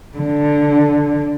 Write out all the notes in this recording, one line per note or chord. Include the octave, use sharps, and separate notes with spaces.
D3